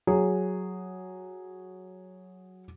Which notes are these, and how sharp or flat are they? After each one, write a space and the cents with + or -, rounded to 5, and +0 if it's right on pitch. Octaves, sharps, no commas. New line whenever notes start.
F#3 +0 G#4 -5